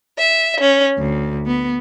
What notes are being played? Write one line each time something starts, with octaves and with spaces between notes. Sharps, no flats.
E5
C#4
D2
B3